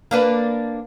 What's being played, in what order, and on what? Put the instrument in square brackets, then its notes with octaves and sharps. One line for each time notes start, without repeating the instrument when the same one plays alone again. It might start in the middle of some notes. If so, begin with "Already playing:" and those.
[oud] A#3 D4 B4